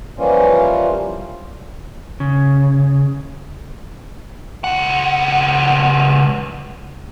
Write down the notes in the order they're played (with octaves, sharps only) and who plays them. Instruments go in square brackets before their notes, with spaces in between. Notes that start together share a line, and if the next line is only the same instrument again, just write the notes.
[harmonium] E3 F3 G3 A#3 C#4 F4
[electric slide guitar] C#3
[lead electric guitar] C#2 F#5